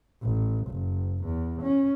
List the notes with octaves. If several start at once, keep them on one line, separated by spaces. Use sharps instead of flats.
A1
F#1
E2
C#4